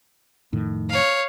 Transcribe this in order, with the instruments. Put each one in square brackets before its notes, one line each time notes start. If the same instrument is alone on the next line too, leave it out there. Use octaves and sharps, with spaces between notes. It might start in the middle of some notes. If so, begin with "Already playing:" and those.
[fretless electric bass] F2 A2 D#3
[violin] C#5 F5